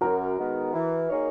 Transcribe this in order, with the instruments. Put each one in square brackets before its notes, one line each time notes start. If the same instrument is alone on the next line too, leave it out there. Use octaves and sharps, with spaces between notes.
[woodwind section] F#2 [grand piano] F#4 A#4
[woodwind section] D#3 G#3 B3
E3
A#3 D#4 G#4 C#5